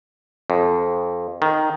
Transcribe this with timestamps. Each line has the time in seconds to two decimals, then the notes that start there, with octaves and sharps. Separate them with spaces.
0.50 F2
1.42 D#3